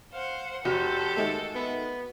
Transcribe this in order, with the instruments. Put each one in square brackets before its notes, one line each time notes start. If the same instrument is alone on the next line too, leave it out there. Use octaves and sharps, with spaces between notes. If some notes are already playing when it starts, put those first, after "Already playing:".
[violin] C5 F#5 [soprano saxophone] F5
[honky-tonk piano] F1 G6 [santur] F#4 [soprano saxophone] G4 [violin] A4
[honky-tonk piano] D#3 G#3 A3
[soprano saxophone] B3